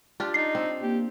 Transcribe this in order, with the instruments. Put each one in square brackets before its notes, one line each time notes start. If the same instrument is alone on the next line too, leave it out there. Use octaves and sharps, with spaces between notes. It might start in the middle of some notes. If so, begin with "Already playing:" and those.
[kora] D4 F4 G4
[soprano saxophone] D#4 [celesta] C7
[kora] C4
[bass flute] A#3 [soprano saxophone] G4